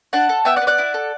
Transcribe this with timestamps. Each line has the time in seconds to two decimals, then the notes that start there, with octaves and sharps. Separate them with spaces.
0.13 D4 F#5 A5
0.29 A4
0.45 B3 E5 G5
0.56 D5 F#5
0.62 B3
0.67 D5 F#5
0.78 E4
0.94 A4